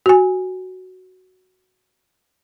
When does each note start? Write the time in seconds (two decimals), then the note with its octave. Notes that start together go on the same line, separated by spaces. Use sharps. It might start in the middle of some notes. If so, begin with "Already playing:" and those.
0.06 F#4 G#5